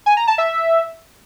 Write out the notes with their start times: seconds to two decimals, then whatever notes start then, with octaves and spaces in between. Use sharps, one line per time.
0.06 G#5
0.17 A#5
0.27 A5
0.38 E5